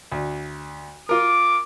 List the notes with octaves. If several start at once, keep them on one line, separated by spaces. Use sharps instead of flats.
D2
F4 A#4 D6